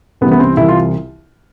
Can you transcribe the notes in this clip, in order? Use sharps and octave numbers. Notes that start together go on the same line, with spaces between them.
C2 C3 E3 B3
B3
C4
C2 C3 E3 E4
F4